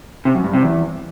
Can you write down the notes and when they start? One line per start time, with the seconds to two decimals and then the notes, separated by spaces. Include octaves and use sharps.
0.25 C3
0.35 F#2
0.44 G2
0.53 C3
0.63 E2